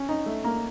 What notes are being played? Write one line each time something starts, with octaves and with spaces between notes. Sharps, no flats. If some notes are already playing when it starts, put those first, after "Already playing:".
Already playing: C#4
D#4
A3
A#3